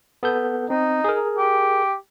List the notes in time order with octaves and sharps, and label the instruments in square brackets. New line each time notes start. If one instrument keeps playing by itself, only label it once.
[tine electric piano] B3 A4 G6
[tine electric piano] C4 [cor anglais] D#4
[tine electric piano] G#4 A#4
[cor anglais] G4